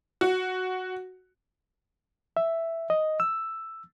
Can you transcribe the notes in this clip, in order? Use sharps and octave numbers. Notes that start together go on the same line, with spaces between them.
F#4
E5
D#5
E6